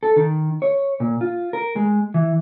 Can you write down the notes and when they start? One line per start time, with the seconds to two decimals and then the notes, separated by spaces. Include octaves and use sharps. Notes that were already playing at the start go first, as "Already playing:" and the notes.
0.03 A4
0.16 D#3
0.62 C#5
1.00 A#2
1.21 F4
1.53 A#4
1.76 G#3
2.14 E3